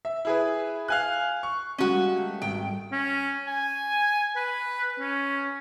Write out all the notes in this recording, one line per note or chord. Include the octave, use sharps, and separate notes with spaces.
E5
E4 G#4 B4
F5 G#5 F#6
C#6
G3 G#3 A#3 C#4 F#4
A3
G#1 G5
C#4
G#5
B4
C#4